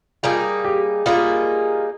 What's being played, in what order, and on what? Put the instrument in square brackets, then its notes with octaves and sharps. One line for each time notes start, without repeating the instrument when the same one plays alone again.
[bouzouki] G3 A#3 D#4 G#4 [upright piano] F4
[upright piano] G4
[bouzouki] G3 A#3 D#4 G#4 [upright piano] F4